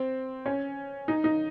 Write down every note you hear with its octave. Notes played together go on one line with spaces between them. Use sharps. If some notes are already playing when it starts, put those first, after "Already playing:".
Already playing: C4
C#4
D#4
D#4